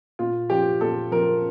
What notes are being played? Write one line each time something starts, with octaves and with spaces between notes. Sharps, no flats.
A#2 F4
F3 G4
A#2 A4
F3 A#4